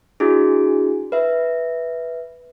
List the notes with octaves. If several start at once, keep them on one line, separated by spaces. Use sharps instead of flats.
D4 E4 F#4 G#4
B4 E5